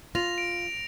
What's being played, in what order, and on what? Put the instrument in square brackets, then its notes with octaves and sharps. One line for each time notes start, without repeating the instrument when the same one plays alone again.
[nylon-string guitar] F4 [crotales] A#6 F7
[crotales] D7